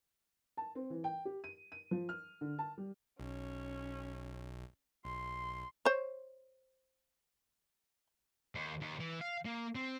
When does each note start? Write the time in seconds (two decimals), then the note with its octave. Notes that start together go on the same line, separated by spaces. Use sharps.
0.57 A5
0.75 C4
0.90 E3
1.04 G5
1.25 G4
1.44 D#7
1.72 D#7
1.91 F3
2.09 F6
2.41 D3
2.59 A5
2.78 G3
3.20 B1 C#4
5.05 B1 C6
5.85 C5 C#5
8.55 D#2
8.81 D#2
9.00 E3
9.21 F5
9.45 A#3
9.75 C4